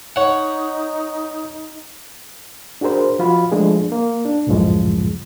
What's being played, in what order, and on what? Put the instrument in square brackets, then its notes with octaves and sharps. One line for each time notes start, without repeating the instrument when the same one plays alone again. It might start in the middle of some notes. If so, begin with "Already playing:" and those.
[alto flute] D#4 [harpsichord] C#5 F#5
[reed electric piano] D4 F#4 G#4 A#4 C5
F3 F4 F#4 B5
F3 G#3 A3 D4 G#4
A#3
D4
C#2 F#2 A2 C#3 F3 G#3